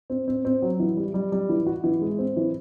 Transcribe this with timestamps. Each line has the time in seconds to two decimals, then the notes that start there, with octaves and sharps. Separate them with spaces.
0.10 C4
0.28 C4
0.45 C4
0.62 F#3
0.80 E3
0.97 G3
1.14 G3
1.32 G3
1.49 E3
1.67 F#4
1.84 E3
2.01 G#3
2.19 C4
2.37 E3